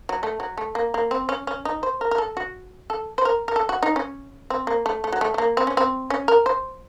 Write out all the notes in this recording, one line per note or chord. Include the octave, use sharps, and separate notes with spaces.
F#3
A3
F#3
A3
A#3
A#3
C4
C#4
C#4
D#4
C5
A#4
A#4
A4
F#4
A4
C5
A#4
A#4
A4
F#4
D#4
C#4
C4
A#3
A3
A3
F#3
A3
A3
A#3
C4
C#4
C4
C#4
A#4
C5